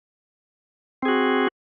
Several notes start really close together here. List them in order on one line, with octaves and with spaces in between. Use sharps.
C4 G#4 F#4